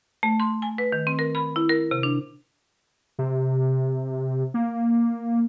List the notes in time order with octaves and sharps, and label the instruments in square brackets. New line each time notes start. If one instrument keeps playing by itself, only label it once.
[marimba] A3
C6
G#5
B4
D#3
C4
A#4
B5
E4
A#4
C3
D4
[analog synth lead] C3
A#3